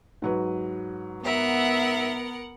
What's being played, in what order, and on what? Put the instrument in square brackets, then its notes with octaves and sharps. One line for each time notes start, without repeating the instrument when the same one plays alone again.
[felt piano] G#2 F#3 B4
[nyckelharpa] B3 [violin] A#4 F#5 [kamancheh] E5